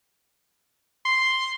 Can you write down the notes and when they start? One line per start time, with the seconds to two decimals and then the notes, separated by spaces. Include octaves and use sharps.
1.05 C6